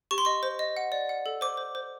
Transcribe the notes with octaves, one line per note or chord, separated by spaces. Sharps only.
G4 C#6
C6
D#5 C#6
C5
D#5
F#5
D5
F#5
A4
C5 D6
C5
C5